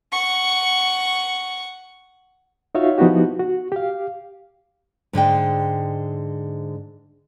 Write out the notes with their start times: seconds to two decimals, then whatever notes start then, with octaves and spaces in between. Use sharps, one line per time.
0.12 F#5 C#6
2.75 D#4 F4 F#4 C#5 E5 F5
2.98 F3 B3 D#4 E4 F#4 G4
3.39 F#4
3.72 G4 F5
5.13 G#2 D3 G#3 G5